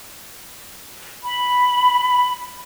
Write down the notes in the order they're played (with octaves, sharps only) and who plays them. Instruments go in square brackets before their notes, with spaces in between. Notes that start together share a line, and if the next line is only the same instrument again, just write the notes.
[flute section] B5